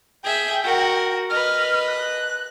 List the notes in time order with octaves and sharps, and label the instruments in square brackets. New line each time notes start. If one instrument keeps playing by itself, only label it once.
[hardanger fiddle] G#4 E5 [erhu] G5
[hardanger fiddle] F#4 A#4
[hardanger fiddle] B4 D#5 [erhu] F6
[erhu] F#6